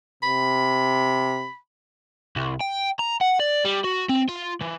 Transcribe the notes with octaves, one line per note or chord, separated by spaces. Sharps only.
C3 B5
C2
G5
A#5
F#5
D5
G3
F#4
C4
F4
E3